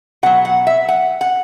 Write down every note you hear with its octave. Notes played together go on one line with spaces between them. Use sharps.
B2 F#3 F#5
F#5
E5
F#5
F#5